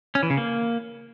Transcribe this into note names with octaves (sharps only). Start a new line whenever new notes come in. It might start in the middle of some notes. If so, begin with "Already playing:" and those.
C#4
E3
C#3
A#3